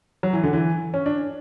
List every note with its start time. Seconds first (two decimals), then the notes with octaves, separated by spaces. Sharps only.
0.23 F#3
0.33 E3
0.43 D3
0.53 E3
0.94 C#4
1.06 D4